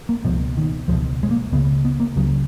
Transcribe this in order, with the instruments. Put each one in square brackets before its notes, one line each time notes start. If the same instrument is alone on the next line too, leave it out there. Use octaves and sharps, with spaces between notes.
[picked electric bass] A#3
C#2 B2 F3
D#3
C#2 F3
B2
G#3
A#3
C#2 C#3 B3
B3
A#3
C#2 C#3 F#3